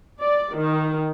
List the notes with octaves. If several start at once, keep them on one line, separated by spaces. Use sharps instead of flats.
D5
D#3